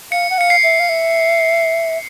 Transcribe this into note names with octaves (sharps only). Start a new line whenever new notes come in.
F5 C#7
F#5
F5 C#7
C7
E5
F5
E5